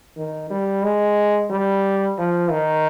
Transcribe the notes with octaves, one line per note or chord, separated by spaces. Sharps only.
D#3
G3
G#3
G3
F3
D#3